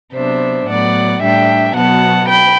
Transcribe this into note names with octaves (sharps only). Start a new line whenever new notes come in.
C3 F#3 B3 D4 C5 E5
A2 F#3 B3 D5 F#5
A2 G3 D4 E5 G5
B2 F#3 B3 F#5 A5
G5 B5